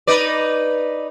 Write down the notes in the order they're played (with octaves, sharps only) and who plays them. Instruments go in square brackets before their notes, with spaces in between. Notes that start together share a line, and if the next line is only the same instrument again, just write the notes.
[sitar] D#4 B4 D5